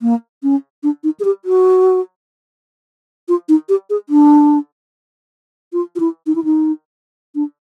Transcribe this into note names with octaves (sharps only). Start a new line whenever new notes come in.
A#3
C#4
D4
D#4
G#4
G4
F#4
F4
D#4
G4
G#4
D4
F4
F4
E4
D#4
E4
D#4
D4